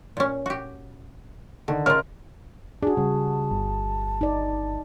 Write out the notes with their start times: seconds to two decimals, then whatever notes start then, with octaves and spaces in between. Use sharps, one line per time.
0.17 A#2 C#4
0.46 F#4 G4
1.68 D3 D#3
1.86 C#3 F4 A#4 D#5 F6
2.83 D4 F#4 G#4 A5
2.97 C#3 G3
3.51 G1
4.21 D#4 D5